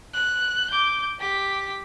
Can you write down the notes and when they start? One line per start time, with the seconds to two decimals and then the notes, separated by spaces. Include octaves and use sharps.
0.14 F#6
0.71 D6 G6
1.19 G4 B6